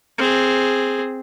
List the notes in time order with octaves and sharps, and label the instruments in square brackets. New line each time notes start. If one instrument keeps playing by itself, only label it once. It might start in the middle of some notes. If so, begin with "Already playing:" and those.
[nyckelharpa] C4 G#4